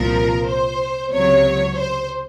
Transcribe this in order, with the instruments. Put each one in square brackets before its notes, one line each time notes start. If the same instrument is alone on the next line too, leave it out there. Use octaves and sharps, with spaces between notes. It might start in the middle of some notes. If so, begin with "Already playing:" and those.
Already playing: [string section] C2 A#2 F3 A#4
C5
C#2 C3 F#3 C#5
C5